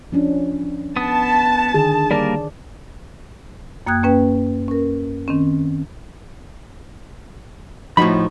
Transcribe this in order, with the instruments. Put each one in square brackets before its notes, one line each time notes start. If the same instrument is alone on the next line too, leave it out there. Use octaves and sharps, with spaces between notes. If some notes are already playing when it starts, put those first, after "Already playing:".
[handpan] F3 C#4 D4
[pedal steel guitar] B3 D#6 [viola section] A5
[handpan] D3 D#3 G#4
[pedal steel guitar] G3 A#3 A#4 [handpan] D5
[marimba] F#2 A#3 G5 D#6 F#6 G#6
A#3 C#4 B4 G5
C#4 A#4
D#3 C4 C#4
[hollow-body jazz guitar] A2 B5 [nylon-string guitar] F3 D#4 F#4